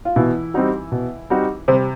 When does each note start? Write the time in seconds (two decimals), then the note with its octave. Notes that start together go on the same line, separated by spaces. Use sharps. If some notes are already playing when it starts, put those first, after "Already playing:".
0.05 F4
0.16 B2 E3 E4
0.54 G3 C4 D#4 F#4
0.92 B2
1.30 G3 C4 D#4 F#4
1.68 C3 G3 C4